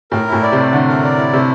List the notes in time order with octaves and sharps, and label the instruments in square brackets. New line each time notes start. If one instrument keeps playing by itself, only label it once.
[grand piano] A2 [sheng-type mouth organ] A#4
[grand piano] A2 [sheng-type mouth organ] E4
[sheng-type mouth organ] D5
[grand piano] C3
[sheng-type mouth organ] A3
[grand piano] D3 [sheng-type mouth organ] A3
[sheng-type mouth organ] A#4
D5
E4
[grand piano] C3 [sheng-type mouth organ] A3